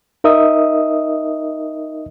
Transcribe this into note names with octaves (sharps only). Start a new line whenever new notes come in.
D#4 A#4 D#5 E5 D#6